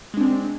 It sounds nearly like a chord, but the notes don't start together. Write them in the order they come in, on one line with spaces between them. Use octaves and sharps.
G#3 D4 C4